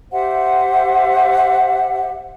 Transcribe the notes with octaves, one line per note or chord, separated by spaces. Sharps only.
G4 C5 E5 F#5